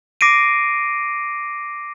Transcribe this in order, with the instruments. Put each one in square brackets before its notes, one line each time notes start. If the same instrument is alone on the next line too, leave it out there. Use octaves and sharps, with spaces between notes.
[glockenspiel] D6 A#6 C7 D7 D#7